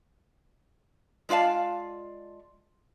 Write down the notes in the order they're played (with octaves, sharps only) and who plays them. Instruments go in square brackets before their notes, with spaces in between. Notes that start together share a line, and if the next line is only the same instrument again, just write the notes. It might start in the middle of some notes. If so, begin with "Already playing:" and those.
[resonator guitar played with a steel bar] G#3 F4 D5 F5 A5